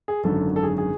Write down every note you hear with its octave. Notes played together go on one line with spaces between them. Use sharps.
G#4
G#1 F#2 D3 A4
A4
G#4
G#4